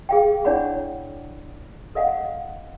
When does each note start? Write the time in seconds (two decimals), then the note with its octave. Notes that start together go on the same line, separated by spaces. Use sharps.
0.09 G#4 F5 G5
0.45 D4 E4 C#5 D5 F#5 B5
1.95 A4 D#5 F5 F#5